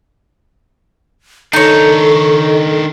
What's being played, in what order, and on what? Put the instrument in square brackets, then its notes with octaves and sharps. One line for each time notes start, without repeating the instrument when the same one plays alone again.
[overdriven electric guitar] D#3 D4 [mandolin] D#4 C#5 [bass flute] A4